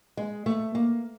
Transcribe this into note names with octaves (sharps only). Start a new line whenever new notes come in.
G#3
A3
A#3